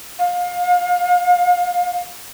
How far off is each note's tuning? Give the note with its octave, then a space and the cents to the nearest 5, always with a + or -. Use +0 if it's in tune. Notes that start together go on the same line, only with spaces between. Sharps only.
F5 +35